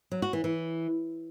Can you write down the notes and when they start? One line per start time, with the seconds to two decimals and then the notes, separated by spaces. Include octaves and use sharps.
0.12 F#3
0.22 F#4
0.33 E3
0.44 E3